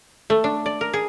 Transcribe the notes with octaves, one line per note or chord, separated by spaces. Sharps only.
A3
D4
D5
A#4
G#4